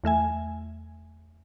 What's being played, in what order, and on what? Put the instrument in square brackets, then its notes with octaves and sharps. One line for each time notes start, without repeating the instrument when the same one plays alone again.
[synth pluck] E2 A3 E5 G#5